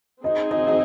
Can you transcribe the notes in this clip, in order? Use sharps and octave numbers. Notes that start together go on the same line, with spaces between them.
C4 D#4 G#4 D#5
D#5
D#5